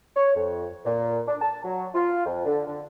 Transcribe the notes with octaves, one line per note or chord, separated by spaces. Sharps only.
C#5
F2
A#2
D4
A5
F#3
F4
F2
D3
D3